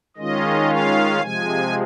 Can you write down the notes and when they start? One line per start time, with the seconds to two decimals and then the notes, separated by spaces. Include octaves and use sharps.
0.17 D#3 G#3 C#4 F4 D#5
0.69 F5
1.21 C3 F3 G#3 G#5